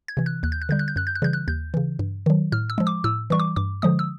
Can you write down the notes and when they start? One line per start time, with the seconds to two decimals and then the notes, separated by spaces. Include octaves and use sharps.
0.08 G#6
0.17 C3 E3
0.26 F#6
0.43 D#2 F#6
0.52 G6
0.62 F#6
0.69 D3 G3 G6
0.79 F#6
0.88 G6
0.96 F#2 F#6
1.07 G6
1.15 F#6
1.22 C#3 E3 G3 G6
1.33 F#6
1.48 D#2 G6
1.74 C#3 E3
1.99 G2
2.26 D#3 F#3
2.52 A2 F6
2.70 E6
2.78 F3 G#3
2.87 D6
3.04 A2 E6
3.30 E3 G3 C#6
3.40 D6
3.56 G2 D6
3.82 D3 F3 G#3 D#6
3.99 E6